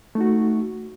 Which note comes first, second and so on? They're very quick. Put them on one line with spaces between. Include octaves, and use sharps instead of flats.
A3 D#4 F#4